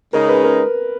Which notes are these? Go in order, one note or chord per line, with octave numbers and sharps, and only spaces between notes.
C#3 G#3 D#4 A#4
B4
A#4